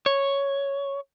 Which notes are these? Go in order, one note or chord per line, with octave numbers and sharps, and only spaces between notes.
C#5